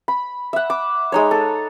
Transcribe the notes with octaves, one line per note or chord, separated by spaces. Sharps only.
B5
E5 F#5
D6
G#3 D#4 C#5
A4